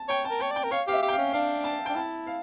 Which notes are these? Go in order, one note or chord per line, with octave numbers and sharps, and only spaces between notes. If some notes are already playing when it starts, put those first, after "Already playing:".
Already playing: A5
C#5 G5
A5
A#4
C#5 G5
D5 G5
A#4
C#5 F5
G4 F5
E5
G4
G5
F5
C#4
D4 F5
A5
D4 G5
E4 A5
F5